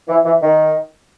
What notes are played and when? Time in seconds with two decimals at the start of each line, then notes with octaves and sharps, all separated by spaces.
0.09 E3
0.24 E3
0.42 D#3